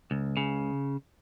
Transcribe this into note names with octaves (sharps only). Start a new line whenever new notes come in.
C#2
C#3